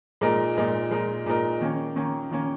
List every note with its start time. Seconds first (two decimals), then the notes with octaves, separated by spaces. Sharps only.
0.21 A#2 G#3 D#4 A#4
0.57 A#2 G#3 D#4 A#4
0.91 A#2 G#3 D#4 A#4
1.26 A#2 G#3 D#4 A#4
1.61 D#3 A#3 C#4
1.96 D#3 A#3 C#4
2.31 D#3 A#3 C#4